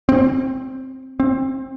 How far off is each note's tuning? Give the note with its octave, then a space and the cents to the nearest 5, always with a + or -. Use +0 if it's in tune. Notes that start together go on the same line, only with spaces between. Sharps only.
C4 +5
C4 +25